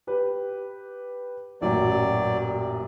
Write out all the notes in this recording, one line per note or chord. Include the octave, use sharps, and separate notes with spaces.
G4 B4
A1 F#2 A#2 F#3 D5